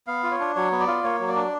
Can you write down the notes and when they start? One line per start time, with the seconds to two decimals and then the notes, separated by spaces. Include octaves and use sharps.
0.07 B3 F5
0.23 F4
0.31 C#5
0.40 D4
0.56 F#3 C#5
0.72 B3
0.80 D5
0.88 F4
1.04 A#3 C#5
1.20 F#3
1.28 D5
1.36 D4